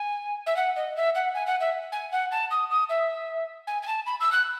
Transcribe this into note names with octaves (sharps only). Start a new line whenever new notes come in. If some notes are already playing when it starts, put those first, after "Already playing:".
Already playing: G#5
E5
F#5
D#5
E5
F#5
G#5
F#5
E5
G#5
F#5
A5
D#6
D#6
E5
G#5
G#5
A5
B5
E6
F#6